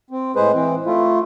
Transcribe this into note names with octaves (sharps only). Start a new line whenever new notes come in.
C4
A2 G#3 G#4 B4 C5
E3 C4
A3 E4 F4